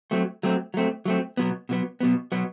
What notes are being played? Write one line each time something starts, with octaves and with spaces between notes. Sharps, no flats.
F#3 A3 C4
F#3 A3 C4
F#3 A3 C4
F#3 A3 C4
B2 F#3 B3
B2 F#3 B3
B2 F#3 B3
B2 F#3 B3